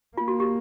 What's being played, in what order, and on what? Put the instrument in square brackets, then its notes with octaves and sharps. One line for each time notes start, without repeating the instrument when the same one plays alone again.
[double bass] A#3 [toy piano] F4
[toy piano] F#4
G4